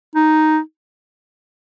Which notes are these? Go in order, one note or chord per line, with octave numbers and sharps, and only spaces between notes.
D#4